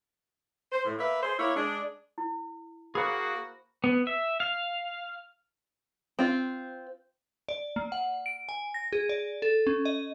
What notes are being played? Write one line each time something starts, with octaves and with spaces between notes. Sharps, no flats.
C5
A2
A#3 B4 E5
G#4 C5
A#3 E4 C#5
G#3 D4
E4
A#3 F#4 G#4 C5 F#5 B5
B3
E5
F5
C4 F4
D5
A#3
F#5
D7
G#5
A#6
G#4
D5
A4
C#4
D#5